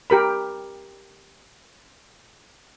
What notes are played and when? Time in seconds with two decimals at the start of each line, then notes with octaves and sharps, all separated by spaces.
0.10 G4 A#4 B5